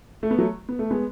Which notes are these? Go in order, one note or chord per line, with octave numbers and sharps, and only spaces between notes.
A3
B3
F#3 A3
B3
A3
G#3 B3